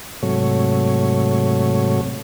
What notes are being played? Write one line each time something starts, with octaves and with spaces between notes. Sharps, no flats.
G#2 C3 F#3 A3 C#5